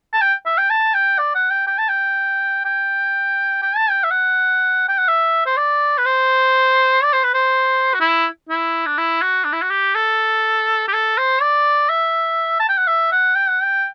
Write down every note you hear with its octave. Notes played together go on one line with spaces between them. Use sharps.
A5
G5
E5
G5
A5
G5
D5
F#5
G5
G5
A5
G5
G5
G5
A5
G5
E5
F#5
G5
F#5
E5
C5
D5
B4
C5
D5
C5
B4
C5
F#4
E4
E4
D4
E4
F#4
D4
E4
F#4
G4
A4
G4
A4
C5
D5
E5
A5
G5
F#5
E5
F#5
G5
F#5
G5